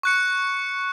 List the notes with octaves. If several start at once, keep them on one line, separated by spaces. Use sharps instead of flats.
C#6 F#6 C#7